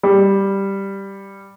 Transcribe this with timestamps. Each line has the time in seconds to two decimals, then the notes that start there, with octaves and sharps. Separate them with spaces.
0.03 G3